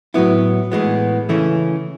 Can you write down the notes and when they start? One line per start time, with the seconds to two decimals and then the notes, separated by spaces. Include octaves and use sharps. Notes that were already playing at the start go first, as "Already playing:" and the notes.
0.14 A2 F#3 B3 E4
0.72 A2 E3 G#3 B3
1.29 C#3 E3 A3 C#4